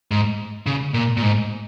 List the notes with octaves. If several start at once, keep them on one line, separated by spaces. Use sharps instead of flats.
G#2
C#3
A#2
A#2
G#2